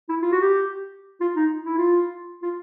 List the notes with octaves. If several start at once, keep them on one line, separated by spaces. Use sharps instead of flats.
E4
F4
F#4
G4
F4
D#4
E4
F4
F4